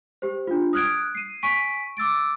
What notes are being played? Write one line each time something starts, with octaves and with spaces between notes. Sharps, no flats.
G4 C5
D4 F4
D#6 F6 F#6 G#6 D7
C7 D#7
G#5 C#6 B6 D7 D#7
D6 E6 A6 D7